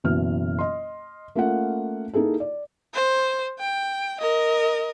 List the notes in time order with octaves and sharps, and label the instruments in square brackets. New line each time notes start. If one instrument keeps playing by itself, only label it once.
[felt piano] F#1 B2 E3 F6
D#5 C6
A3 A#3 C#4 F4 F5 F#5
A#3 D#4 E4 G#4 A4
D5
[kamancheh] C5
G5
A#4 D#5